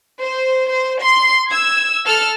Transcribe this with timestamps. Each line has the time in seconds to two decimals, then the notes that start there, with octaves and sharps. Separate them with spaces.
0.22 C5
0.71 C5
1.02 C6
1.50 E6 G#6
2.05 A4 F6